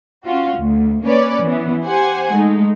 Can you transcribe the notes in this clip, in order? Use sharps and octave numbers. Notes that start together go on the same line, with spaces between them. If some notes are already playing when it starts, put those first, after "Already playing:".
C#4 F4 F#4
D2
A#3 C#4 B4 C#5 D5
E3 B3
G4 C5 F#5 G#5
G#3 A3 D#4